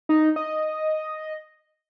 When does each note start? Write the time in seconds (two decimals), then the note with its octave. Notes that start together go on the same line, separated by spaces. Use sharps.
0.09 D#4
0.36 D#5